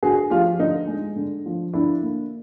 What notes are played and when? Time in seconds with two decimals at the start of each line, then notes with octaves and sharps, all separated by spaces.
0.03 D3 F#4 G#4
0.30 F3 F4 G4
0.59 D3 D#4
0.87 G#3
1.16 D3
1.46 F3
1.73 D3 D4 E4
2.02 A#3